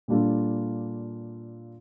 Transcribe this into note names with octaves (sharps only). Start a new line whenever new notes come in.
A#2 G3 D4 F4 A4